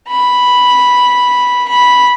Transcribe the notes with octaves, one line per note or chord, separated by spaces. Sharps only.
B5
B5